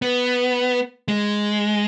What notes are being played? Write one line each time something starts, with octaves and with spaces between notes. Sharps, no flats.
B3
G#3